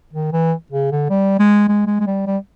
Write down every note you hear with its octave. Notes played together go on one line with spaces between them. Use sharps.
D#3
E3
C#3
D3
G3
G#3
G#3
G#3
G#3
G3
G3